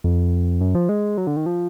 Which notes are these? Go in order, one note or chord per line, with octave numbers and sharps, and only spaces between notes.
F2
F#2
F3
G#3
F#3
D3
D#3
F3